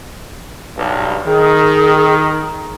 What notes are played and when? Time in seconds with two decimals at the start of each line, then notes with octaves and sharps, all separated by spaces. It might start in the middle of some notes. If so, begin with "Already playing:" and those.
0.77 B1 G2
1.26 D#3 G#4